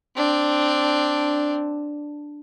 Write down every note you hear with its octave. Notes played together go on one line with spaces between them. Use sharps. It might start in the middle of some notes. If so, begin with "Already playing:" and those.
C4 D4